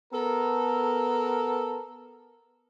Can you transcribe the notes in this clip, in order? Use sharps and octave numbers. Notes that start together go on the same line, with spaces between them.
B3 A4 A#4